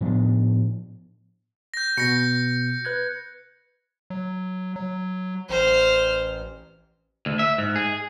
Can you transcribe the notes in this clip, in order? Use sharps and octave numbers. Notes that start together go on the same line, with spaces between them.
A2 F3 B3 D4
G6 A#6
B2 B3 A#6 C#7
B4 F#6 G#6
F#3
F#3
A1 C5 F6
D2
E5
G#2
G#4